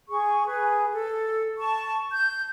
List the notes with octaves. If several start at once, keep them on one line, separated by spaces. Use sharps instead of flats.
G#4 C#6
G#4 B4
A4
A5 C#6
G6